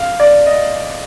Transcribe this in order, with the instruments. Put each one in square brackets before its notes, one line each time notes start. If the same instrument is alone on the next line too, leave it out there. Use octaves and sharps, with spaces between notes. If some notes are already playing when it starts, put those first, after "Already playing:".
Already playing: [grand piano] F5
D5
D#5